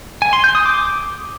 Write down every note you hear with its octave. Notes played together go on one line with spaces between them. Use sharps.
G#5
C6
G6
D#6
D6